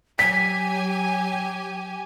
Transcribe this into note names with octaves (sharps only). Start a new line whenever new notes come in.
F#3 G4 G#5 B6